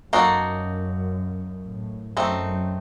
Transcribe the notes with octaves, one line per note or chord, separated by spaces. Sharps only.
F#2 A#3 D#4 F#4 A4
A2
F#2 A3 C4 D#4